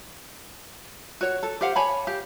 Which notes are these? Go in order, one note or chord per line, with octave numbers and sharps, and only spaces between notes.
F#4 C#5
A4
G4 C5 F5 F#5
C#5 G#5 A5 B5
G4 F5